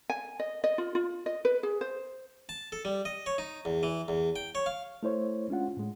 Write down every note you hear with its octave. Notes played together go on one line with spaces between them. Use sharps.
G#5
D#5
D#5
F4
F4
D#5
B4
G#4
C5
A5
A4
G3
D#5
C#5
D#4
E2
E3
E2
G5
C#5
F5
A3 E4 C5 C#5
G#3 C#4 D4 F4 F#5
A2 G#3